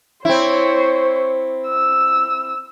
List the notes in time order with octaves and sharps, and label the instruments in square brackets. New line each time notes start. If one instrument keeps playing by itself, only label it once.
[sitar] C4 E4 [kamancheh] C5 C#5
[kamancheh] E6